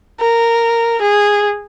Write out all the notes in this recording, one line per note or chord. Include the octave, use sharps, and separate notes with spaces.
A#4
G#4